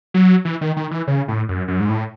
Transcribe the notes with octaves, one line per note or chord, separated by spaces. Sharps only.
F#3
E3
D#3
D#3
E3
C#3
A2
F#2
F#2
G#2
A2